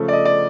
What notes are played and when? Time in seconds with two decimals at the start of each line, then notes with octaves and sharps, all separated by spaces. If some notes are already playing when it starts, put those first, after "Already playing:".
Already playing: C#3 F3 A3
0.08 D5
0.13 D#5
0.25 D5